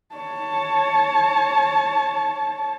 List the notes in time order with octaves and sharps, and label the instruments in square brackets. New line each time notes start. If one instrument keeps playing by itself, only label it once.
[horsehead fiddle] C#5 A5